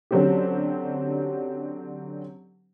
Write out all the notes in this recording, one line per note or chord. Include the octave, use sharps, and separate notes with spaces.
D3 F#3 C4 C#4 G4